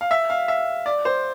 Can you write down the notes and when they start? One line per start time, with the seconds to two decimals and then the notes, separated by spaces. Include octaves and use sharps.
0.01 F5
0.11 E5
0.30 F5
0.48 E5
0.86 D5
1.05 C5